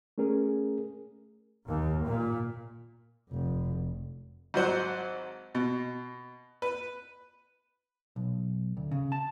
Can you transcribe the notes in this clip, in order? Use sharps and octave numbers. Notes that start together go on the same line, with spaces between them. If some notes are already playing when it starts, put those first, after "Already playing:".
A3 C#4 G#4 A#4
D#2
A#2
F1 F2
G#1 F#3 C5 F#5
B2
B4
B1
D2
C#3
A5